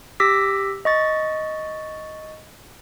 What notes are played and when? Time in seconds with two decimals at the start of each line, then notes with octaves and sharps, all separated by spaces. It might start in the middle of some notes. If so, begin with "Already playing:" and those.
0.20 G4 D6 E6 A#6 B6
0.85 D#5 C#6 A6